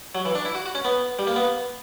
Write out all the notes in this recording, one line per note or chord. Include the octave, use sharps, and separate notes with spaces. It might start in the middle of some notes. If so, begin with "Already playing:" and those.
F#3
E3
D4
E4
F#4
F#4
C#4
B3
G3
A#3
B3